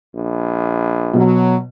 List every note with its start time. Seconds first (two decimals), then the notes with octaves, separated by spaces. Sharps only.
0.15 A#1
1.14 B2 F#3